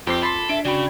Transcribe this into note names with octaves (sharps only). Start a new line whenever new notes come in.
F2 C4 F4 G4 D6 C7
A4 B5 C6 B6
D4 E5 D7
C#3 F#4 D5 G5 B5